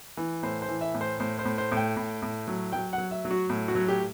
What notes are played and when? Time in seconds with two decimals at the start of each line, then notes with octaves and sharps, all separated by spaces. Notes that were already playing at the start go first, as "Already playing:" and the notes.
0.17 E3
0.43 A2 C5
0.62 C5
0.69 E3
0.81 E5
0.94 A2
1.01 C5
1.20 A2 C5
1.39 C5
1.45 A2
1.58 C5
1.72 A2
1.77 G5
1.97 A2
2.22 A2
2.48 F#3
2.73 F#3 G5
2.93 F#5
2.98 F#3
3.11 E5
3.25 F#3
3.31 F#4
3.50 A2
3.68 F#4
3.75 F#3
3.88 G4